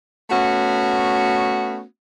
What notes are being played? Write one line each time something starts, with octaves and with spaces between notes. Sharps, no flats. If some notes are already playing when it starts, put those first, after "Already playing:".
A3 B3 C#4 F#4